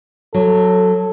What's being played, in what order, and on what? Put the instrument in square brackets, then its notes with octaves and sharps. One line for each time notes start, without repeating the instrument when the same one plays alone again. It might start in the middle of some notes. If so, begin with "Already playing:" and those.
[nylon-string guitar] F#3 [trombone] A4